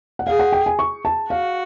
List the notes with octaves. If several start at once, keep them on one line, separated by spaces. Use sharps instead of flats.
F#5
G#4 F5
F#5
G5
G#5
C#6
A5
F#4 F5